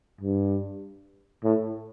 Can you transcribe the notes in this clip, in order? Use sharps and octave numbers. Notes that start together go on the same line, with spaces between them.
G2
A2